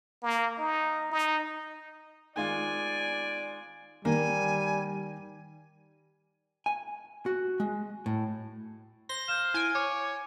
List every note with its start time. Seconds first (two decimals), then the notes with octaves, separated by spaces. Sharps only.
0.23 A#3
0.59 D#4
1.11 D#4
2.36 D#3 G#3 F4 D5 G#5
4.05 D#3 G3 A#3 G#5
6.66 G#5
7.26 F#4
7.60 G#3
8.06 A2
9.09 C5 A#6
9.28 F5 G6 E7
9.54 E4 G#5 D7
9.75 C#5 D6